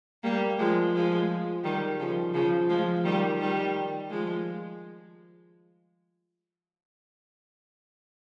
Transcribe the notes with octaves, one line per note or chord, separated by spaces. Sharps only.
G3 A#3
F3 G#3
F3 G#3
D#3 G3
C#3 F3
C#3 F3
F3 G#3
D#3 G3
D#3 G3
F3 G#3